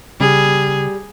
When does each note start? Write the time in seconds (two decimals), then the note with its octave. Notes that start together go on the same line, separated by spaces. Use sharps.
0.20 C#3 G3 G#4